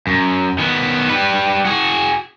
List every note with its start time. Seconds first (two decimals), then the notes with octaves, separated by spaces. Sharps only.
0.07 F#2
0.59 D#3 B3
1.09 G3 B4
1.65 F#4 G#4